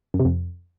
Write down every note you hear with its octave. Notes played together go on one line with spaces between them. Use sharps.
F#2
C3
F2